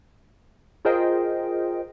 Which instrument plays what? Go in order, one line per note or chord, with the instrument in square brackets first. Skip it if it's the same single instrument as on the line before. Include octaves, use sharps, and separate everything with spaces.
[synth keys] F4 G#4 A#4 C5 D#5 G5